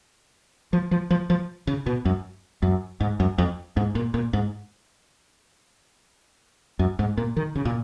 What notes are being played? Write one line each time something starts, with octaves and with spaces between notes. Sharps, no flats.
F3
F3
F3
F3
C#3
B2
F#2
F#2
G#2
F#2
F2
G#2
A#2
A#2
G#2
F#2
G#2
A#2
D#3
C#3
A#2